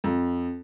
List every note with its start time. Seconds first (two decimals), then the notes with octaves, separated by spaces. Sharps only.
0.04 F2